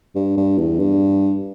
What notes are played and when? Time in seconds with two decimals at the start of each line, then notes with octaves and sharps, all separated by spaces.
0.16 G2
0.37 G2
0.58 E2
0.80 G2